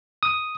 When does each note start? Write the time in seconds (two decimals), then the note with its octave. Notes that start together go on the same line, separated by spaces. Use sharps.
0.23 D#6